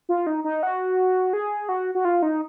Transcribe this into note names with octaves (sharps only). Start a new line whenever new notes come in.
F4
D#4
D#4
F#4
G#4
F#4
F#4
F4
D#4